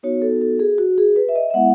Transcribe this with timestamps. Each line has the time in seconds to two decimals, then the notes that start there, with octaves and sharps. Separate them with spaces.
0.03 B3 D#4 F#4 C#5
0.22 A4
0.41 A4
0.59 G#4
0.78 F#4
0.98 G#4
1.16 B4
1.29 E5
1.36 D#5
1.50 E5
1.54 G#3 B3 E4 F#5